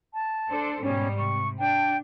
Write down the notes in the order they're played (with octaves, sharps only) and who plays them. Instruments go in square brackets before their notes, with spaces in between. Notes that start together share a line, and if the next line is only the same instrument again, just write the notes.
[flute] A5
[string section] D4 A4 C5
[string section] G#2 B2 G3 [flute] C#4
[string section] C3 [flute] C#6
[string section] D4 [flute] G5